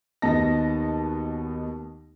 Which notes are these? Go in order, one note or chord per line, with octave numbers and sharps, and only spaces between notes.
D#2 B2 B3 D#4 A5 A#6